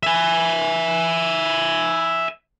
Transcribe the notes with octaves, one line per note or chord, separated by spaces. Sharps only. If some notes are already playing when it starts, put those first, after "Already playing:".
E5 G#5